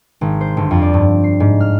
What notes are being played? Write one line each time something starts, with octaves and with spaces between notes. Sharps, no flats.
G#1
C5
G1
F2
D5
G2
C7
G#2
F6